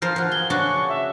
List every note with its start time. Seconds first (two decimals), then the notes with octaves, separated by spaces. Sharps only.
0.02 F3 A#4 C5 F6
0.16 F3 F#4
0.32 G#4 G7
0.50 C#3 D4 F#4 C#6
0.89 E5